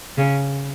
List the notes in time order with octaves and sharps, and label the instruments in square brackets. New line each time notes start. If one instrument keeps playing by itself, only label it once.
[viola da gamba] C#3